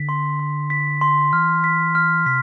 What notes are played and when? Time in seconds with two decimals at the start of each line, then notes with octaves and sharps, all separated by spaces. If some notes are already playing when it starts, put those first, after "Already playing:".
Already playing: D3 B6
0.09 C6
0.39 C6
0.70 B6
1.01 C6
1.33 E3 F6
1.64 B6
1.95 F6
2.26 C3 B6